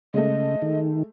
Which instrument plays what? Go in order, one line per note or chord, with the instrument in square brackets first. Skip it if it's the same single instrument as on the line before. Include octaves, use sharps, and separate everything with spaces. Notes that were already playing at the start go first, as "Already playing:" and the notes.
[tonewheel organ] C#3 [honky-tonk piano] G#3 A3 [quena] D#5
[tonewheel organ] D#3